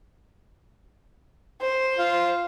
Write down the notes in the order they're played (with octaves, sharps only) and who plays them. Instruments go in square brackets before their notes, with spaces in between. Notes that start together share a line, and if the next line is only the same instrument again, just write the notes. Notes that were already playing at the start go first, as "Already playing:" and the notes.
[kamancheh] C5
[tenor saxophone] F4